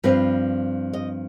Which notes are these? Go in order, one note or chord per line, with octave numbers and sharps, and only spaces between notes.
G2 F3 C4 B4
D#5